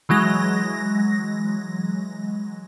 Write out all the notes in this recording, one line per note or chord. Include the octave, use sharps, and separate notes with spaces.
E3 F#3 G#3 A#6